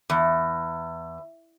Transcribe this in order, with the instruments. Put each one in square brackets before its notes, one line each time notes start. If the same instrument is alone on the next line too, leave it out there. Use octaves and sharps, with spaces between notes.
[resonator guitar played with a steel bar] E2